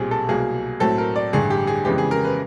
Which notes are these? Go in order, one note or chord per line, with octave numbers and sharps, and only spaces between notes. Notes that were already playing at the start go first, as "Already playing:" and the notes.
Already playing: B1 A#2 G3 C4 G4 G#4
A4
C2 B2 F#3 A#3 G#4
A2 F#3 A3 C4 A4
A#4
D5
A1 G2 D3 G#4
G4
G#4
F2 C#3 E3 G#3 B3 G4
G#4
A#4
B4